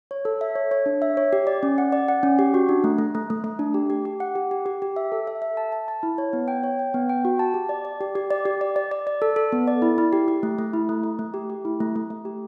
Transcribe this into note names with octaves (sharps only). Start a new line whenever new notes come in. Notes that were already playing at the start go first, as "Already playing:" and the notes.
C#5
A4
E5
C#5
C#5
D4
E5
C#5
G4
D5
C#4
F#5
D5
F#5
C#4
G4
F#4
D4
A3
A3
A3
A3
A3
D4
G4
G4
G4
F#5
G4
G4
G4
G4
E5
A4
E5
E5
A5
A5
A5
E4
C#5
B3
G5
C#5
G5
B3
G5
F#4
A5
G4
D5
D5
G4
G4
D5
G4
D5
D5
D5
D5
A4
A4
B3
D5
E4
E4
G4
G4
A3
A3
E4
A3
A3
A3
G4
G4
E4
A3
A3
A3
G4